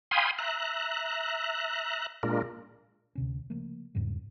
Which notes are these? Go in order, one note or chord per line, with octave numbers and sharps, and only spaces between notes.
F5 G5 G#5 B5 C6 D#6
E5 A#5 F#6
A#2 G#3 D4 F4 A#4
D2 C3 C#4
C#3 F3 A3 A#3
E2 G#2 C#3 G3